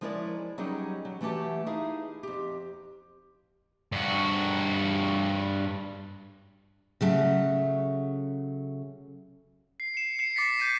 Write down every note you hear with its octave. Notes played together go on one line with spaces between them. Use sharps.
F3 G#3 E4 A#4 C#5 D5
F#3 G3 C#4 D#4 G4 G#4
F#3
E3 A3 F#4 G4 A5
D#4 E4 G#4 F5
F2 G4
G2 F#4
C#3 F#3 A3
C7
C#7 E7
C7 C#7 E7
D6 A6 B6
G6 A6 B6 D#7